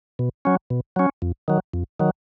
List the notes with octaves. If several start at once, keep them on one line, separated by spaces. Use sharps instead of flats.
B2
F#3 C#4
B2
F#3 C#4
F2
D#3 F#3
F2
D#3 F#3